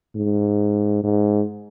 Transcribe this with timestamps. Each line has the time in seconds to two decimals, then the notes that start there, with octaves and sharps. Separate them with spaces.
0.16 G#2
1.04 G#2